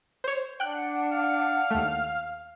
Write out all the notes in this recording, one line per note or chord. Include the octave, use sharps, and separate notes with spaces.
C5 C#5
D4 F#5 G5 F#6
F5
D#2 A3